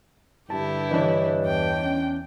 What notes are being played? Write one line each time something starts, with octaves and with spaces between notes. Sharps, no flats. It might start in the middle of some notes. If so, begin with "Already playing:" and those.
G2 D3 E4 G4 A5
E3 D4 C#5 D#5
E2 G5
C#4